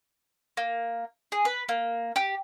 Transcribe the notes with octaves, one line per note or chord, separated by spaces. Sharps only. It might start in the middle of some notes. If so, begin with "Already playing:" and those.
A#3
G#4
B4
A#3
G4